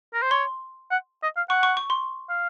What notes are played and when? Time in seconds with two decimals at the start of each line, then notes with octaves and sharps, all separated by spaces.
0.14 A#4
0.22 C5
0.31 C#5 C6
0.91 F#5
1.23 D#5
1.37 F5
1.50 F#5 C#6
1.63 C#6
1.77 C#6
1.90 C6
2.29 F5